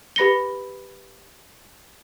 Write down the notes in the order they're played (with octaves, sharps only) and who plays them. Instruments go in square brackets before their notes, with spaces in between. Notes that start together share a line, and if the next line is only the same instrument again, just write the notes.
[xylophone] G4 B4 B5 A#6 C#7 G7